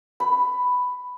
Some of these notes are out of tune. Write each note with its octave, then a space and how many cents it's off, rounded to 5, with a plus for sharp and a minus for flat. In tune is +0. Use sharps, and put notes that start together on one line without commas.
B5 +5